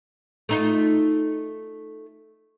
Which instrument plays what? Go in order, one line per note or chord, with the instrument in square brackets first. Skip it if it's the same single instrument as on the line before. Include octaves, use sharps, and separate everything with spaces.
[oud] A3 D#4 F4